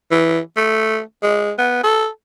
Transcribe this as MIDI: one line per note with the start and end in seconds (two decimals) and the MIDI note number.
0.11 0.40 52
0.57 1.00 57
1.23 1.52 56
1.58 1.79 59
1.84 2.07 69